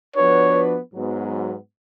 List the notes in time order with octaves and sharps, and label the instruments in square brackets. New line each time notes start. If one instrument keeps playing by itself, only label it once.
[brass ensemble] F3 B3 D4 F#4 B4 [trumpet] C#5
[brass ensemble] G#2 F#3 B3